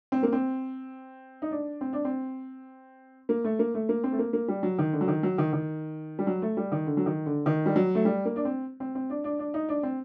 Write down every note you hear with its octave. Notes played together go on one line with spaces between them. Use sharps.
C4
A#3
C4
D#4
D4
C4
D4
C4
A#3
A3
A#3
A3
A#3
C4
A3
A#3
A#3
G3
F#3
D#3
D3
F#3
D#3
F#3
D#3
D#3
G3
F#3
A3
G3
D#3
D3
F#3
D#3
D3
D#3
G3
F#3
A3
G3
A#3
D4
C4
C4
C4
D4
D4
D4
D#4
D4
C4